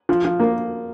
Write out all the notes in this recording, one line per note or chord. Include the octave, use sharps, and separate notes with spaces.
F3
F3
A#3